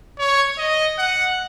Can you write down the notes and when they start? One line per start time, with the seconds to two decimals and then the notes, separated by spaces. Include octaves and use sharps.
0.19 C#5
0.58 D#5
0.98 F#5